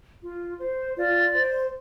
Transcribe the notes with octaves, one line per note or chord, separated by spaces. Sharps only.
F4
C5
F4 D5
C5